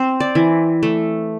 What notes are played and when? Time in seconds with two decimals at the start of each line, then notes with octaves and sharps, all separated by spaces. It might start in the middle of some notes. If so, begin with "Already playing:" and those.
Already playing: C4 C5
0.20 D5
0.35 E3
0.83 A3